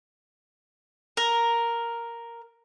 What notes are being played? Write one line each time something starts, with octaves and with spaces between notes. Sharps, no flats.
A#4